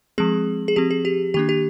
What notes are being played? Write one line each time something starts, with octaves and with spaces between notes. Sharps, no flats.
F3 G#3 C4 G#4
G#4
F3 C4 G4
G#4
G4
D#3 A#3 D4 G4
G4